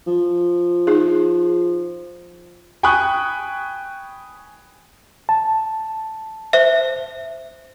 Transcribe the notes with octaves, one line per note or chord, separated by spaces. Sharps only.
F3
D#4 G#4
G5 G#5 B5 C#6 D#6 F#6
A5
C5 E5